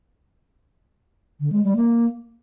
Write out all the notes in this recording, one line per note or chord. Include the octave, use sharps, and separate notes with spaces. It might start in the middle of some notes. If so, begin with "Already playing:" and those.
D3
G#3
G3
A#3